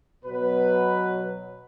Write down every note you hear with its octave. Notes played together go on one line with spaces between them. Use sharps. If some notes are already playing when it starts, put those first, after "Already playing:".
B2 F#3 B3 B4